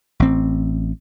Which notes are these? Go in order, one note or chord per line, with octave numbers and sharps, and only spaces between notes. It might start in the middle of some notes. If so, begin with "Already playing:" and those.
A1 C4